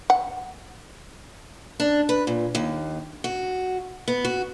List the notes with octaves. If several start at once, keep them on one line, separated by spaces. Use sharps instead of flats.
F#5
D4
B4
A#2
D#2
F#4
B3
F#4